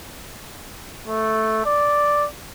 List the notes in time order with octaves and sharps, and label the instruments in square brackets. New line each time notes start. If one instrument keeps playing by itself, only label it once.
[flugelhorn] A3
D5